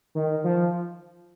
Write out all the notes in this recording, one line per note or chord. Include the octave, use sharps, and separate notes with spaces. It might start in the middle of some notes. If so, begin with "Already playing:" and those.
D#3
F3